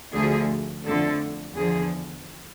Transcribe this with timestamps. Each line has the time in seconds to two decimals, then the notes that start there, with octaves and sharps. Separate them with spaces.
0.14 D2 D3 F3 A3 G#4
0.85 F2 D3 F3 A3 A4
1.55 E2 D3 F3 G#4